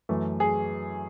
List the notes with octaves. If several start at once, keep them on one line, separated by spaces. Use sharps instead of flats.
F#2 E3 A3
G#4